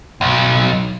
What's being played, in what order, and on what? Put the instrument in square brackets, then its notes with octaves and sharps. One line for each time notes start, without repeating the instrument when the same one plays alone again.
[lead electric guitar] B1